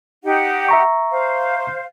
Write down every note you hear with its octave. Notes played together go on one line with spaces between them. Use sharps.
D#4 G4 F#5
E5 A#5 C#6
C5 F5